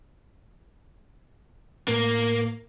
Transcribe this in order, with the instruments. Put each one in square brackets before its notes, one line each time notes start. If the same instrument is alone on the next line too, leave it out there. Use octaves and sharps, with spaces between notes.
[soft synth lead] A2 [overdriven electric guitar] A#3